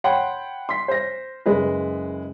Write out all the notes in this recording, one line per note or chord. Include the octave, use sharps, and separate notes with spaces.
C#5 F#5 G5 B5 C6
C6 B6
C5 A#6
F#1 G#3 B4